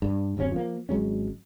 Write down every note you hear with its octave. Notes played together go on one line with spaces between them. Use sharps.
G2
D1 F#2 C3 C#4
F3 A#3
G#1 F#3 G#3 C#4